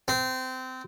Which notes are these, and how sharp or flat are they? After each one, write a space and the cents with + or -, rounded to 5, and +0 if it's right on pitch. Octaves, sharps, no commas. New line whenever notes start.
C4 -25